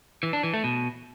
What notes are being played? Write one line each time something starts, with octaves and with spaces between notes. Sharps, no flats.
E3
D4
E3
A3
B2